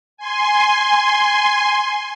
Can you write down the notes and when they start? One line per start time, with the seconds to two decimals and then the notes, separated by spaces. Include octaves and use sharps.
0.17 G#5 C6